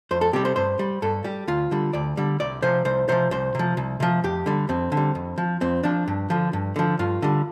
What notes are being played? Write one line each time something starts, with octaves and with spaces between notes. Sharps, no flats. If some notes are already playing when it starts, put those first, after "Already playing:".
F2 C5
A4
C3 G3 G4
C5
G2 C5
G3
G2 A4
G3 G4
D2 F4
D3 G3
D2 D5
D3 G3
C2 D5
C3 F3 C5
C2 C5
C3 F3 C5
C2 C5
C3 F3
C2
C3 F3
F2 G4
D3 G3
F2 C4
D3
G3
F2
F3
F2 C4
F3 D4
G2
D3 F3
G2
D3 F3
G2 F4
D3 G3